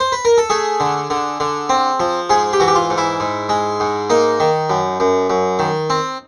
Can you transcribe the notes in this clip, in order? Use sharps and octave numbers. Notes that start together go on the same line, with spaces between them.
C5
B4
A#4
A4
A3 G#4
D3
D3
D3
C4
F3
G#2 G#4
G4
E3 F#4
G4
F4
G#2
E4
G#2
G#3
G#2
A#3 D#4
D#3
F#2
F#2
F#2
D#3
C4